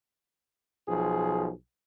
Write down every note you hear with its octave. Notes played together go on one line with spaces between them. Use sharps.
B1 F3 G#4